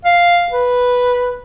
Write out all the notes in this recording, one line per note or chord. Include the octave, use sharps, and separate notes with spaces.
F5
B4